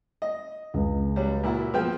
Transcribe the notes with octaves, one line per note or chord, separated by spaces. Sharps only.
D#5
C#2
F#3 G3
A#2 E4 F#4
F3 B3 F4 G#4 G5